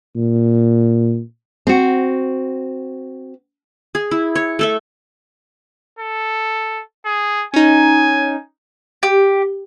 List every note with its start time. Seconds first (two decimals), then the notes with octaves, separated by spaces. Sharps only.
0.16 A#2
1.67 C4 F#4
3.95 G#4
4.11 E4
4.35 C#5
4.59 A3 A4 E5
5.99 A4
7.06 G#4
7.54 C#4 D#4 G#5
9.03 G4